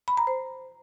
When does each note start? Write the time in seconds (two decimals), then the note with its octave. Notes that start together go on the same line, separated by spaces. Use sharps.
0.08 B5
0.17 A#5
0.27 C5